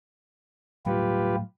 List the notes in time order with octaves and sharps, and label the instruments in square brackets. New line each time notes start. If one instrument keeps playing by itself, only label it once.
[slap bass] A2 F#3 G3 [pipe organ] F4 G4 B4